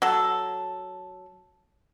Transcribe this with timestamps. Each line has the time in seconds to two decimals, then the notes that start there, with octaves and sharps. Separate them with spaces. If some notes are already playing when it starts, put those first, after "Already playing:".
0.02 F#3 A4